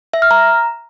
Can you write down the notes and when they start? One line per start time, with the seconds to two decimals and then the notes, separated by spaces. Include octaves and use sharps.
0.14 E5
0.22 F6
0.31 A#5